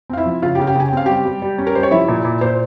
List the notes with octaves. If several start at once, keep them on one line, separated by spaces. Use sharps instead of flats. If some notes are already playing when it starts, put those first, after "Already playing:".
C4 F5
E4 E5
F3
C#3 F4 F5
G4 G5
C#3 F5
G4 G5
C#3 G#5
G5
C4 F5
G3 G4 G5
G3
G3
C#4
A#4
G3 C5
C#5
F3 E4 E5
A#2
A#2
A#2 C5